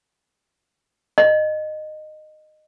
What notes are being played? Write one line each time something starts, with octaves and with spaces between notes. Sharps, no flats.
D#5